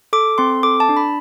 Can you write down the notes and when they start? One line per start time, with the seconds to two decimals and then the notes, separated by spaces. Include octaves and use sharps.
0.13 A4 D6
0.38 C4 C6
0.63 A4 D6
0.80 A5
0.89 D4
0.97 B5